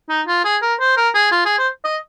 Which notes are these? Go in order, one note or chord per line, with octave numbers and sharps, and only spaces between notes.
D#4
F4
G#4
A#4
C5
A#4
G#4
F4
G#4
C5
D#5